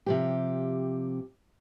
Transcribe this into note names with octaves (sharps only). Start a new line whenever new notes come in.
C3 F3 G4